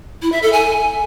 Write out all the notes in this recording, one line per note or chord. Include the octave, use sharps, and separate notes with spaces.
E4
E5
A4
G#5